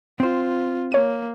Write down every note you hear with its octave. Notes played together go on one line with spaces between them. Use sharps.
C4 F4 C5
A#3 C#5 D#7